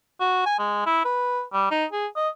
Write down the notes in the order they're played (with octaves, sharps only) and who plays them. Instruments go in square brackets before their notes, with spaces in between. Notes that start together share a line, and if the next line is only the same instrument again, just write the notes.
[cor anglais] F#4
G#5
G#3
E4
B4
G3
D#4
G#4
D#5